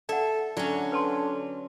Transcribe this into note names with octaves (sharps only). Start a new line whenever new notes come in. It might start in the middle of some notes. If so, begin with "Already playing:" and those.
A4 D5 E5 F#5
D3 F#3 C#4 F4
B4 A5 C6